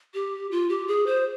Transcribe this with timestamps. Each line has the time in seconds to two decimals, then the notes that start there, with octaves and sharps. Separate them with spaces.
0.14 G4
0.51 F4
0.69 G4
0.88 G#4
1.07 C5